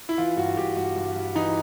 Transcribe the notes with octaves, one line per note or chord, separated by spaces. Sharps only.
E4
E3 F4
G2 F#4
G2 G4
G2 F#4
G2
G3
E3 D#4